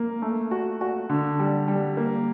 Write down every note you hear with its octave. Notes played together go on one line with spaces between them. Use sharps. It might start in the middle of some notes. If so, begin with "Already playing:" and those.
Already playing: A#3
A3
F#4
F#4
D3
G3
G3
A#3